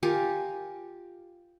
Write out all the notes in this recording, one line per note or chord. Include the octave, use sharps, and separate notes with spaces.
F4 G4 A#4 G#5